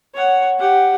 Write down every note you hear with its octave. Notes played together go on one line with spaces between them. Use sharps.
C#5 F#5
G4 F#5